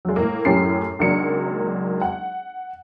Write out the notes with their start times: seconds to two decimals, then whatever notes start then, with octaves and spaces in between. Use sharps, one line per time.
0.05 F#3 G#3
0.16 A2 A#3
0.45 F#2 A2 C#4 G4 C7
0.99 G#1 C#2 F#3 A#3 D4 C#7
2.01 F#5